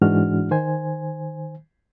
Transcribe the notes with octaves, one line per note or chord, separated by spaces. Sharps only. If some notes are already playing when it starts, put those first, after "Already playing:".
G#2 E3 G#3 D4 F#4 F6
D#3 C5 G#5